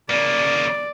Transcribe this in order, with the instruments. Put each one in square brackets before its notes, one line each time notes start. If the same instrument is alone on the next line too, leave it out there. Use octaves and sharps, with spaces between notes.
[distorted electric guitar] C#3 A#3 [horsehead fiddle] D5